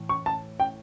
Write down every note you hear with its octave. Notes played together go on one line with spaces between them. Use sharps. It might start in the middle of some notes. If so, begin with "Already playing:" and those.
Already playing: A2 E3
C#6
A5
G5